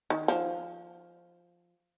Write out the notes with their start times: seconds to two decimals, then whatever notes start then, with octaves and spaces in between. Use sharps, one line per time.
0.10 D#3
0.28 F3